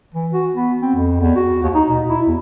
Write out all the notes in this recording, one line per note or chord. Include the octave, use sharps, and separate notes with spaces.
E3
F#4
B3
C4
F2
E2
F#4
D#2
D#4
B2
E4
E2